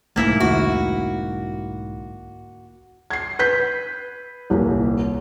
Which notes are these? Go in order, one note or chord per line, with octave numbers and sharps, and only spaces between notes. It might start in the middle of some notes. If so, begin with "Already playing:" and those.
B1 G#2 A3 A#3 E4
D#2 D3 F#4
G#6 C7
B4 G6 B6
D#1 C2